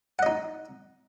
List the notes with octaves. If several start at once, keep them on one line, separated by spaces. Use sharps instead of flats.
D#4 D#5 F#5